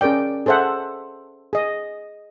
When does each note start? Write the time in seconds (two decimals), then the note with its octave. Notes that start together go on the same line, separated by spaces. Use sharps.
0.01 C#4 G#4 A#4 D5 G5
0.46 G#4 A4 C5 E5 F#5
1.53 G#4 D#5